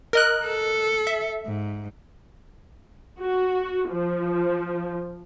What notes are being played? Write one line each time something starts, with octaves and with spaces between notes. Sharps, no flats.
A#4 D#5 F#6
A4
E5
G#2
F#4
F3